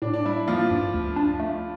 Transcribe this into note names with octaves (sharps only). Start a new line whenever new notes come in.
A2 D4
D4
G3 E4
F3 A#3 F4
G2
D2
D4
A3